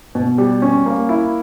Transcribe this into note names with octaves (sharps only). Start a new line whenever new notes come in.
B2
G3
C#4
A#3
E4